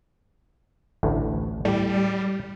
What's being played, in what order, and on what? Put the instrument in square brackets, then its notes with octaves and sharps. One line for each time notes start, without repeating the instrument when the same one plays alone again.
[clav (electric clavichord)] A1 D2 A2
[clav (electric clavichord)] A2 G4 [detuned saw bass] G3